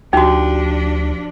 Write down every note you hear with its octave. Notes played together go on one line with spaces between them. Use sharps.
D2 F3 D4 D#4 F#4 G4